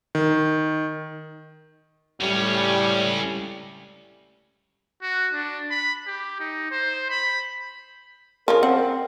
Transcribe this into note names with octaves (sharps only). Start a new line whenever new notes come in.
D#3
C#2 A2 G3 C#4
F#4
D4
B5
G4
D#4
C5
B5
C#3 F3 A#4
C4 F#5